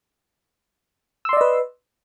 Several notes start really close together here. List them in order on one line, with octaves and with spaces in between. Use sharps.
E6 C6 D5 D#5 B4